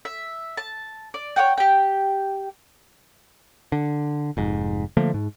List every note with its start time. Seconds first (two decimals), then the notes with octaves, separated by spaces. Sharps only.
0.05 E5
0.57 A5
1.14 D5
1.36 C#5 D5 F#5 G5
1.57 G4 G5
3.72 D3
4.37 F1 G#2
4.97 D3 F3 A3 A#3
5.14 G#2